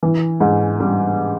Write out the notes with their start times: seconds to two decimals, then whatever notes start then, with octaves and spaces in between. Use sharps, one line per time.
0.03 E3
0.40 G#2
0.80 G3